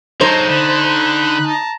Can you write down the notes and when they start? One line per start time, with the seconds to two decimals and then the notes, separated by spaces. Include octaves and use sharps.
0.21 F#3 G#3 D#4 C5 A5 A#5
0.49 D3 B5 F#6
1.47 A5 A#5